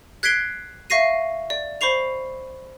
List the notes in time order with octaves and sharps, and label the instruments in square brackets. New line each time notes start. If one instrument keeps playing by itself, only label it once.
[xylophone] F#6 G#6 B6 C7 D7 G7
E5 F5 C#6 A#6 C7 D#7
D5
C5 B5 C#6 C7 F7